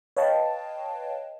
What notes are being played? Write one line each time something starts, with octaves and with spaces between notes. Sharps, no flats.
B4 C#5 D#5 F5 G5 A5